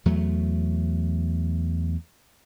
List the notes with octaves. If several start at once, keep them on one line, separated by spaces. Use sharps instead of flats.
E2 F#3 A3